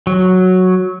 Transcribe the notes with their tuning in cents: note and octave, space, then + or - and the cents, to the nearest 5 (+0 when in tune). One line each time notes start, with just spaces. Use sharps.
F#3 -5